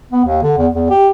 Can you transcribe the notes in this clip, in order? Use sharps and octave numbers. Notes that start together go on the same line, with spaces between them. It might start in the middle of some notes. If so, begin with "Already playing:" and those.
B3
D#2
D3
E2
E2
G4